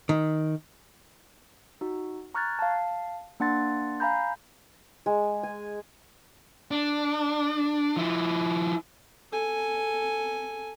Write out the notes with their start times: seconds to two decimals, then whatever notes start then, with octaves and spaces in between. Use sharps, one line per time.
0.09 D#3
1.81 D#4 F#4
2.34 A#5 C#6 F6 F#6 G#6 A6
2.59 F5 A5
3.40 A#3 D4 F#5 C6 A6
4.00 F5 G#5 A#5 B5 G6
5.06 G#3
5.43 G#5
6.71 D4
7.97 F3 E4
9.32 A4 G#5